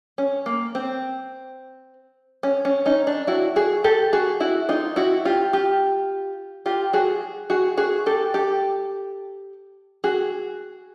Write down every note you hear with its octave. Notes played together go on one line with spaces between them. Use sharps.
C#4
A#3
C4
C#4
C#4
C#4 D#4
D4
E4 F#4
F#4 G#4
G4 A4
F#4 G#4
E4 F#4
D#4 F4
E4 F#4
F4 G4
F4 G4
F4 G4
F#4 G#4
F#4 G#4
F#4 G#4
G4 A4
G4 A4
F#4 G#4